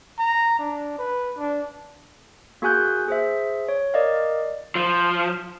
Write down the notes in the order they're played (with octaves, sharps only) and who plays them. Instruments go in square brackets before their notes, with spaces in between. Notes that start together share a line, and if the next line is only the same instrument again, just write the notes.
[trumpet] A#5
D4
B4
D4
[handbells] A#3 F#4 G#4 G#5 F#6 G6
G#4 C5 E5
C#5
A#4 D5 D#5 F5
[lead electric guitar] F3